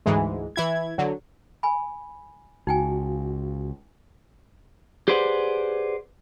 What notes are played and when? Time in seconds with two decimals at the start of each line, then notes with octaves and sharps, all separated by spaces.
0.06 D2 G#2 E3 G#3
0.56 E3 E4 G#6
0.98 D3 F#3
1.63 G#5 B5
2.67 C#2 D#4 F#4 G5 G#5
5.08 G4 G#4 B4 C5 D5 F#5